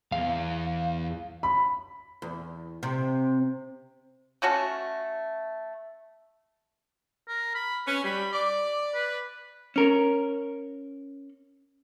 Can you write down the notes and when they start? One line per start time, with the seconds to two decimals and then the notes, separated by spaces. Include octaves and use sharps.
0.12 E2 F5
1.43 B5
2.22 E2
2.83 C3
4.42 A3 C#4 F#4 A4
7.28 A#4
7.55 B5
7.87 C#4 B4
8.04 G3 B5
8.33 D5 D6
8.94 B4
9.76 C#4 A#4